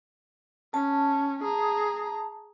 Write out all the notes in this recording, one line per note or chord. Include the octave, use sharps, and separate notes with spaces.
C#4 A5
G#4 A#5